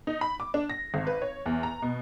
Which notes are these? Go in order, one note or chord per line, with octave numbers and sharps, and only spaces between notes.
D#4
B5
D6
D4
A#6
G#1
B4
C#5
E2
A#5
B2